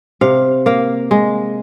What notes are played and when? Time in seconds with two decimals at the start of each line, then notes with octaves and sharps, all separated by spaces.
0.21 C3 F5
0.66 A#3 F5
1.11 G#3